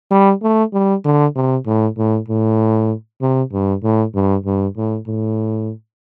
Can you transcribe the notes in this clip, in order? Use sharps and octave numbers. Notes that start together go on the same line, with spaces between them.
G3
A3
G3
D3
C3
A2
A2
A2
C3
G2
A2
G2
G2
A2
A2